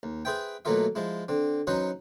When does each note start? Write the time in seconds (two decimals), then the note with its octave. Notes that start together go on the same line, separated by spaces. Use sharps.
0.03 D#2
0.25 G#4 B4 C5 E5 G5
0.65 B2 F#3 A3 A#3 F4 E5
0.95 F3 G#3 E4
1.28 D3 C4
1.67 F#3 C#4 D#4 F#4 B4 C5